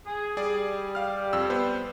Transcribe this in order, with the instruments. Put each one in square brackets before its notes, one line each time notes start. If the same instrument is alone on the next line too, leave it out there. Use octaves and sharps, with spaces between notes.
[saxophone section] G#4
[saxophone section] G3 [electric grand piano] G#4 D5
[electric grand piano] F5 F6
F2 E6
B3 B4 C5